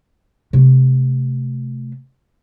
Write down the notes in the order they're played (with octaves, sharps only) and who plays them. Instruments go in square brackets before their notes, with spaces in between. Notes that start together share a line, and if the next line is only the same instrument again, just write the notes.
[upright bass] C3 A3